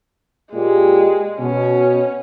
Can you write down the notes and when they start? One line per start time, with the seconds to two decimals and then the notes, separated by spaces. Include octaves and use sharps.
0.53 A#2 G#3 A#3 G4
1.40 B2 C#4